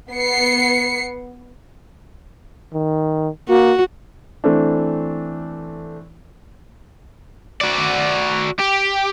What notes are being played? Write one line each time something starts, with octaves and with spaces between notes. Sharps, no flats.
B3 C7 C#7
D#3
A#3 F#4
E3 A3 C4 D4
F#4 D5
G4